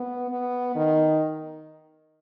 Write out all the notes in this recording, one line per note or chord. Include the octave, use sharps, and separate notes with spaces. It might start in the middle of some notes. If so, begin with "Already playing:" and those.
Already playing: B3
B3
D#3